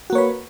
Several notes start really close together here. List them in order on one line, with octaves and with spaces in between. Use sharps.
F#4 A#3 C#5 B4